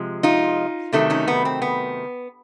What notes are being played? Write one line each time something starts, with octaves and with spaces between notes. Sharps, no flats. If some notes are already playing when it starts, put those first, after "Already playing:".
Already playing: C3 F3 G#3
D#4 F4
C3 D#3 F#3 A3
C#4 D#4
B3
C4
B3